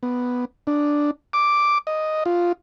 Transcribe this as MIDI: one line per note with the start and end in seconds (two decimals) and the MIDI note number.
0.03 0.45 59
0.67 1.11 62
1.33 1.78 86
1.87 2.24 75
2.26 2.52 65